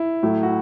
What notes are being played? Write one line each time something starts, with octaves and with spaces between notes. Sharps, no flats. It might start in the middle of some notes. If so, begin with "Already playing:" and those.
Already playing: E4
A2 F#3 A3
F#4